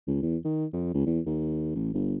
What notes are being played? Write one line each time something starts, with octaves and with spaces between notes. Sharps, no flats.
C#2
E2
D#3
F2
C#2
E2
D#2
A1
G1